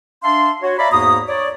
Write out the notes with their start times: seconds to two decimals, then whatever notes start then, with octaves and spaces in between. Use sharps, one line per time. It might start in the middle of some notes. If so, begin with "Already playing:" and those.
0.24 D4 E5 F5 A5 C6
0.62 F#4 C#5
0.79 D5 E5 F5 A#5 B5
0.91 E2 G#2 A#3 F#4 A#5 D#6
1.29 C#5 D5